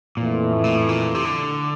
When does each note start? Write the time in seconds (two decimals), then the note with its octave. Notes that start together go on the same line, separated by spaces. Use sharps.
0.17 F2 A#2 E3 A3
0.53 A2
0.64 A#2
0.76 A2
0.89 A#2
1.15 C3
1.25 D3